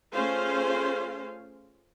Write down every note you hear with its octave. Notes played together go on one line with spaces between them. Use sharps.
A3 C#4 F4 G#4 C5 F5